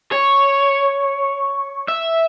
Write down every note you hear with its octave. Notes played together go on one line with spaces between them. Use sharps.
C#5
E5